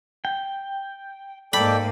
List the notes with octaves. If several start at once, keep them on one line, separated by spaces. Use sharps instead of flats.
G5
G#2 A#3 A4 D5 G5 B5